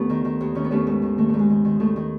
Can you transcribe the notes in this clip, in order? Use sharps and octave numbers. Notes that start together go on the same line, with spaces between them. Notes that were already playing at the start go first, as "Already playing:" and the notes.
Already playing: D#2 A3 B3
D#3
D#3
D#2
D#3 C#4
B3
D#2 A3 C#4
G#2
D#3
D#3 A3
A3
G#2
G#3
D#3
D#3
D#3 A3
D#3